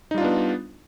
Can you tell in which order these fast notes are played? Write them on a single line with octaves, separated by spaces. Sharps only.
D#4 G3 F4 D4 B3